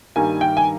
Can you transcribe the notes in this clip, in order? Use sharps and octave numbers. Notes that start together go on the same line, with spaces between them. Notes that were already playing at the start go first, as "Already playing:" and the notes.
G2 D#3 G3 A#3 G#5
G5
G#5